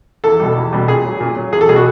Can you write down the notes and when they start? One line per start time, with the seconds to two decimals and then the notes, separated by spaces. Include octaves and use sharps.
0.24 E2 A4
0.40 B2 G3
0.57 E2
0.73 B2 G3
0.88 A#2 G#4
1.05 F#3
1.20 A#2
1.37 F#3
1.52 E2 G#4
1.61 A4
1.68 B2 G3 G#4
1.76 F#4